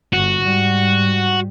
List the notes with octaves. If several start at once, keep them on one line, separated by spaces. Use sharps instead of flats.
G1 F#4
G#2 G3